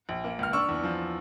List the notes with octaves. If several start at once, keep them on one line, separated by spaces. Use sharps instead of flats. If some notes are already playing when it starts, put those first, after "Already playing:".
A#1
A#3
C#2 F6
D4 C#6 E6
E2
F3